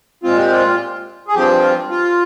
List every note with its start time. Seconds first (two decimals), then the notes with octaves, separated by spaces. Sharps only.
0.23 A#2 G#3 C4 F4
0.38 G4
0.50 F4
1.28 G#4
1.34 G2 F3 C4 G4
1.62 F4
1.90 F4